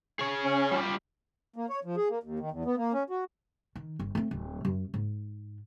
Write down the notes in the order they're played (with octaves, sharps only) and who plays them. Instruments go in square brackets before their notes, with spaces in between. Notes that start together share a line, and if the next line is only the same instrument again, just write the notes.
[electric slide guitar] G#4 C#5
[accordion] C#4
[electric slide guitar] G3 F4 G4
[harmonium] A#3
C#5
F3
G#4
A#3
D#2
D#3
E2
B3
A#3
C#4
F#4
[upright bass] D#3
G1
A3 C4
D1
F#2
G#2